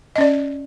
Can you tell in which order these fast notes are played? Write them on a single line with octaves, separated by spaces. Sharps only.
D#5 C#4 D5